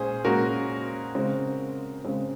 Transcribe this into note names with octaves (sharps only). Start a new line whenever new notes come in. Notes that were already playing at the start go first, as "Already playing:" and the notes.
Already playing: A#2 G#3 C#4 G#4 C5
A#2 G#3 C#4 F#4 A#4
C#3 G#3 C4
C#3 G#3 C4